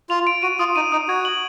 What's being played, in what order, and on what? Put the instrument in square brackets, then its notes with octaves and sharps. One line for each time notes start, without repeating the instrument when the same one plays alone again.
[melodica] F4 [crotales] F7
[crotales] D7
[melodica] F#4 [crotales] D#7
[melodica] F4 [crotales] D#6
[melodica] D#4 [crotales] D#7
[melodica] D#4 [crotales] D#6
[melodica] F#4 [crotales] G#6
[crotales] F#7